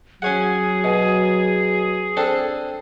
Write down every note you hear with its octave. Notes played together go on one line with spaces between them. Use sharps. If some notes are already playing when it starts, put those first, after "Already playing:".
F#3 C#4 G#4 C#5 F#5
B2
C4 D4 A4